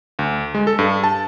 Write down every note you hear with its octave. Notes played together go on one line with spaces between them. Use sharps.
D2
G#3
A4
G2
A5